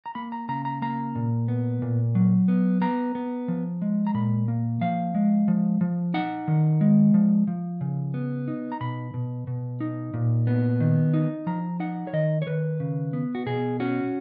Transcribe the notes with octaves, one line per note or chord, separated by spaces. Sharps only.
A#5
A#3 B5
A#5
C#3 A#5
A#5
A#3 A#5
A#2
B3
A#2
F#3
B3
B3 A#5
B3
F3
G#3
A#5
A#2 B5
A#3
F3 F5
G#3
F3
F3
D#4 F#5
D#3
G#3
F3
F3
C#3
B3
D#4
A#5
B2 B5
B2
B2
D#4
A#2
B3
D#3
D#4
F3 A#5
D#4 F#5
C#5
D#3 D#5
C#5
D#3 B4
C#3
B3
F#4
B2 G#4
C#4 F#4